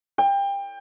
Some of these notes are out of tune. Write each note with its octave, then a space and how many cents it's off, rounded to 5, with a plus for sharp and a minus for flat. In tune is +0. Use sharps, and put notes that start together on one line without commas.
G5 +25